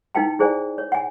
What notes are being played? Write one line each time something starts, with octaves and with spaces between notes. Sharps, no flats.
D#4 E4 B4 F5 G5 A5
E4 G#4 C5 D5 G#5
C#5
F#5 G#5